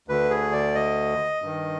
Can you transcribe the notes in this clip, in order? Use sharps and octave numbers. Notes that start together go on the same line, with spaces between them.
D2 D3 B4
G#4
D5
D#5
G2 D#3